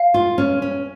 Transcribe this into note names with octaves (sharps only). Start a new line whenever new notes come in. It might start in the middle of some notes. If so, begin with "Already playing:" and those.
Already playing: F5
F4
C#4
C#4